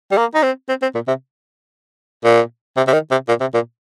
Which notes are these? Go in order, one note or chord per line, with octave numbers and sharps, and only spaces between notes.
G3
A#3
D#4
C4
C4
C4
A#2
C3
A#2
C3
C3
D#3
C3
A#2
C3
A#2